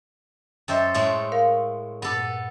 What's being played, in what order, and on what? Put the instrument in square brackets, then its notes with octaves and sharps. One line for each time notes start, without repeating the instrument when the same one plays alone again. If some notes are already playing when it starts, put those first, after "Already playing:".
[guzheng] F#2 A4 C5 [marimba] D#5 E5 G5
[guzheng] A2 G#3 A3 [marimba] E5
[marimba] A#4 F5
[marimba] G2 A#2 [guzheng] B3 A4